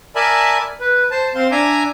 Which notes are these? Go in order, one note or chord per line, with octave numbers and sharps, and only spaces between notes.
A#4 D5 E5 G#5 A5 B5
B4
C5 A5
C4 C5 F5 C6
D4 E5 G#5 A#5 D6